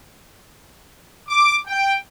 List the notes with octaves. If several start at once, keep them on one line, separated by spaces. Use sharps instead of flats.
D6
G5